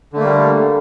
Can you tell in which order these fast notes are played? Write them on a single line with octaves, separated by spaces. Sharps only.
D3 A3 A#3 G3